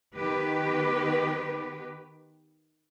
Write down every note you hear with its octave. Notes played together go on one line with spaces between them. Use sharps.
D#3 B3 G4 B4